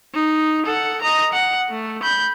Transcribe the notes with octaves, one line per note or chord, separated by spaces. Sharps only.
D#4
A4 F#5
D#5 A#5
F#5
A3
B5 G6